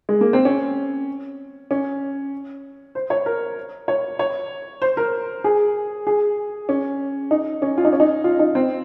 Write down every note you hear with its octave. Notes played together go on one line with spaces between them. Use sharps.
G#3
A#3
C4
C#4
C#4
C5
C#5
A#4
C#5
C#5
C5
A#4
G#4
G#4
C#4
D#4
C#4
F4
D#4
C#4
D#4
F4
D#4
C4